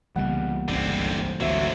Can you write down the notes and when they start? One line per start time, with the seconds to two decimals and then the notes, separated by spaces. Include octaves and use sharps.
0.15 C2 C#3 E3 G3 A#3 B3 F#5
0.68 G1 C#2 D3 C4
1.40 G#1 D2 D3 F#3 F#4 C5 E5